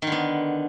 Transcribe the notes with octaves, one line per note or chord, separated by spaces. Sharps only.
D3 D#3 B3